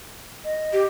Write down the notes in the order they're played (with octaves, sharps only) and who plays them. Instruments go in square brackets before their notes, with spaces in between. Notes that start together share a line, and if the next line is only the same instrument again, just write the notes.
[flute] D#5
[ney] G4